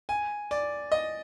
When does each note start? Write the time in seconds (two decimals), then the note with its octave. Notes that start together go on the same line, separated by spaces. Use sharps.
0.09 G#5
0.51 D5
0.92 D#5